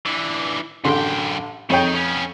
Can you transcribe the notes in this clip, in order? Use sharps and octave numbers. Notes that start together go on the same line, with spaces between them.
D3 E3
A1 F#2 D3 G5 C6
F2 D#3 D#4 C#5 G5
B3 C#4